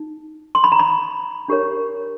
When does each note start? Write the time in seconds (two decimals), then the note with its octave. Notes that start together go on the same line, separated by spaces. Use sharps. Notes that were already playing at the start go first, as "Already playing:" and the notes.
Already playing: D#4
0.55 C6
0.64 B5
0.72 A#5
0.79 B5
1.48 D4 G4 A#4 C#5